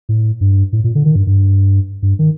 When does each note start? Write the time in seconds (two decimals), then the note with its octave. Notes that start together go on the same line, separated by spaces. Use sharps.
0.09 A2
0.41 G2
0.73 A2
0.84 A#2
0.95 D3
1.05 D#3
1.16 G2
1.27 G2
2.03 G2
2.19 D#3